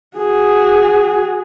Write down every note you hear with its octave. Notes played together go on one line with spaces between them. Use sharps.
F#4 G#4